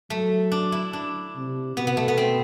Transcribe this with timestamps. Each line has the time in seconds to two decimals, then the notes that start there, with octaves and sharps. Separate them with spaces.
0.10 F#3 A3
0.52 D4
0.72 E4
0.93 D4
1.36 C3
1.77 B2 B3
1.87 B3
1.97 A3
2.08 B3
2.18 C4